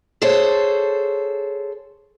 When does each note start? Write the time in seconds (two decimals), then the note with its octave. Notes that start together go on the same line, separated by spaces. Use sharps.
0.22 G#4 A4 C5 C#5